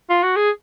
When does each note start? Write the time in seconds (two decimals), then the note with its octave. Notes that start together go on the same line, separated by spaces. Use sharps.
0.09 F4
0.23 F#4
0.36 G#4